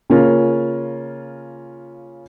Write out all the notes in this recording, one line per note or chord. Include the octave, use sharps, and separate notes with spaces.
C#3 A#3 C#4 F4 A#4